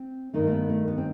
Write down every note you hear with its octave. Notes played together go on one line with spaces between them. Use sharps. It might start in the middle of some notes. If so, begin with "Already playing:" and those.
Already playing: C4
G2 D#3 A3 D#4
A3
B3
A3
B3
C4